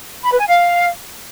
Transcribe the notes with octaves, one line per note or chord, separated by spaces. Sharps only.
B5
B4
G#5
F5